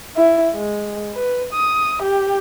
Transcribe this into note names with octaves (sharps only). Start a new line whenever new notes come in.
E4
G#3
B4
D#6
G4